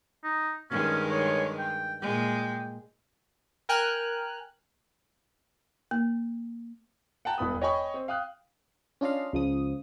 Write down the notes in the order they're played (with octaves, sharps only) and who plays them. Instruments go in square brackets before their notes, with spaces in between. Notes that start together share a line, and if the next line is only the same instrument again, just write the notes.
[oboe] D#4
[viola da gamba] G2 D#3 G#3 [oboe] C#4
[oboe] C#5
G5
[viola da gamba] A#2 G#3 [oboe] G5
[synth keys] A#4 G5 G#5 F6 F#6
[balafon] A#3
[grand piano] F#5 G5 A5 A#5
E1 G2 B3 B5 D#6
C#5 D#5 G5 G#5 B5 C#6
C4
F5 G5 D#6 F#6
[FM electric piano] C#4 D4 F4 D#5 F5
C#2 F3 D#6